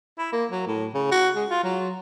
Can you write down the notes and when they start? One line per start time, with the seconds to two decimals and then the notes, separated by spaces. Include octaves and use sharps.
0.18 E4
0.32 A#3
0.51 F#3
0.67 A2
0.94 C#3
1.11 F#4
1.36 G#3
1.50 F4
1.64 F#3